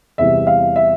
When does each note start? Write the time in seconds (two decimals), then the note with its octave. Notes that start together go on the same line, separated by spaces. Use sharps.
0.18 E2 C3 E3 G3 E5
0.47 F5
0.76 E5